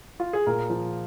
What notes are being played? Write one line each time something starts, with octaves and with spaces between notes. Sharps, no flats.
F4
G#4
A#2 A#4
F3